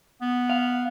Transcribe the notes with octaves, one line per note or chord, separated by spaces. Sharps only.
B3
F5